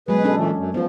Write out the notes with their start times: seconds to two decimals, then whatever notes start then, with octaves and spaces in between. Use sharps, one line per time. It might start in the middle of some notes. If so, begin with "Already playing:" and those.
0.08 B2 F#3 G#3 G#4 B4
0.24 C#4 D4 A4
0.37 A#2 E3 A3
0.56 F#2
0.74 F3 B3 F4